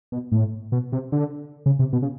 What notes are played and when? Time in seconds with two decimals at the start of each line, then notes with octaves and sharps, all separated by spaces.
0.12 B2
0.32 A2
0.72 B2
0.92 C3
1.12 D3
1.66 C#3
1.79 C3
1.93 B2
2.02 C#3